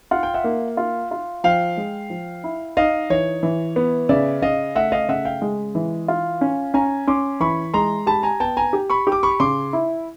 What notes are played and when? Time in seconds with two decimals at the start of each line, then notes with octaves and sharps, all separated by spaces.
0.11 F4 F#5
0.23 G5
0.34 E5 F#5
0.44 A#3
0.77 F4
1.11 F4
1.44 F3 F5 G5
1.77 G#3
2.10 F3
2.44 E4
2.77 D#4 D#5 F5
3.10 E3 C#5
3.43 E3
3.76 B3
4.09 C#3 D5 E5
4.42 C#3 D#5 F5
4.76 A3 E5 F#5
4.92 D#5 F5
5.08 C#3 E5 F#5
5.25 F5 G5
5.42 G#3
5.75 E3
6.08 F4
6.41 C#4
6.74 C#4 G#5 A#5
7.07 C#4 C6 D6
7.40 E3 B5 C#6
7.73 G#3 A#5 C6
8.06 G4 A5 B5
8.23 G#5 A#5
8.40 B3 G5 A5
8.57 G#5 A#5
8.73 G4
8.90 B5 C#6
9.07 G4
9.12 D6
9.23 B5 C#6
9.40 C#3 C6 D6
9.73 E4